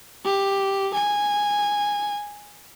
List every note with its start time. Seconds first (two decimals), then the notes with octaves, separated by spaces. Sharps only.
0.25 G4
0.94 G#5